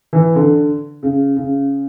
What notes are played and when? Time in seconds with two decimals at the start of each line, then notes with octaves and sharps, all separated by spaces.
0.13 E3
0.35 D3
1.03 C#3
1.36 C#3